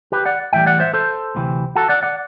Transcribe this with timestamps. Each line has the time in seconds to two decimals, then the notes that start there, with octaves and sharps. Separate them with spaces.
0.12 G4 B4
0.25 D5 F#5
0.53 A2 E3 G3 E5 G5
0.66 D5 F#5
0.80 C5 E5
0.94 A4 C5
1.35 D2 C3 E3 A3 C4
1.76 F#4 A4
1.89 D5 F#5
2.03 D5 F#5